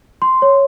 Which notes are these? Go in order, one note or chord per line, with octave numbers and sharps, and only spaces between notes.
C6
C#5